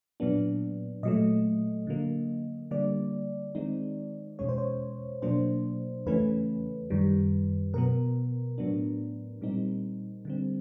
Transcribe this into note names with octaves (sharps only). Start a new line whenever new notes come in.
A#2 F#3 B3 D4
A#2 F#3 A3 D#5
D3 F#3 A#3
D3 G3 A#3 D5
D#3 G#3 C4 D#4
E2 B2 G#3 C#4 C#5
C5
C#5
B2 F#3 A#3 D4 C5
E2 C#3 E3 A3 C#4 B4
F#2 D#3 G3
B2 F#3 B3 A#4
A2 F#3 B3 D4
A#2 G3 C4 D#4
D3 G3 C4